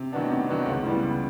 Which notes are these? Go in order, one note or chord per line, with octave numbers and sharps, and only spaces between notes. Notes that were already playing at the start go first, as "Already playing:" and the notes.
Already playing: C3
D#3 F#3 B3 D4
C3
D#3 F#3 B3 D4
C#2
C#3 E3 G3 B3
C#2